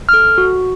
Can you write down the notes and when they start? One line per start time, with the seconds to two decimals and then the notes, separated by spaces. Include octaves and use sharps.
0.09 A4 F6
0.38 F#4